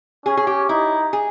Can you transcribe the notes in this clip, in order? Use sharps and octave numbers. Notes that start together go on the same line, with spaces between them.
C#4 G#4
G#4
G4
D#4 E4
G#4